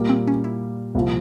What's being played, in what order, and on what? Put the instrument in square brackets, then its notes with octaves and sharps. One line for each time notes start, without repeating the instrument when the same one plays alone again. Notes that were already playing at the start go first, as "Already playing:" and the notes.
Already playing: [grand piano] A#2 G3 A#3
[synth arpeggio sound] C4
C#4
E4
[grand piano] C2 A#2 F3